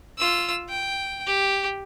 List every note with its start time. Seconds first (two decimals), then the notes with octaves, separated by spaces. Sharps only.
0.18 F4 E6
0.68 G5
1.27 G4